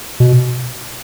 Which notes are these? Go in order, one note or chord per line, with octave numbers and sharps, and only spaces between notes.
B2